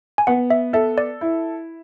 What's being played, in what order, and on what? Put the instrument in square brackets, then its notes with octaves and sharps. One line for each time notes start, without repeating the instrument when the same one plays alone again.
[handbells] G#5
[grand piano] B3 [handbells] F#5
[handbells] E5
[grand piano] A4 [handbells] E5
[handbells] D5
[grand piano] E4